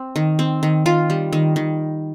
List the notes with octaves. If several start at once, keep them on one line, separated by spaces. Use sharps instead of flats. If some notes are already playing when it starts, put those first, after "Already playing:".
Already playing: C4
D#3
C4
D#3
D#3 F4
G3
D#3
D#3